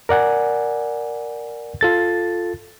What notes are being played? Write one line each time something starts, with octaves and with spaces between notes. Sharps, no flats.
A#4 D5 F#5 G#5
F4 A4 A6